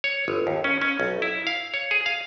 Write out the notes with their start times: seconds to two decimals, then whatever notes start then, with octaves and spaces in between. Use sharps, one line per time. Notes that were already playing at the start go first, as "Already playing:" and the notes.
0.04 C#5
0.28 G1
0.47 D#2
0.64 C#4
0.81 C#4
1.00 B1
1.22 E4
1.47 F5
1.74 C#5
1.91 G#4
2.06 F5